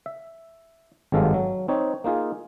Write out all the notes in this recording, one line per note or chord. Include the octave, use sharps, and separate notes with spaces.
E5
G#1 G2 F#3 G#3 A4 F5
F#3
C4 D#4 C#5
A#3 D#4 F4 G#4